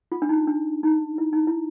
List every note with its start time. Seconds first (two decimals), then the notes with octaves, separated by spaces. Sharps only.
0.12 F4
0.22 D4
0.29 D#4
0.47 D4
0.83 D#4
1.18 E4
1.33 D#4
1.47 E4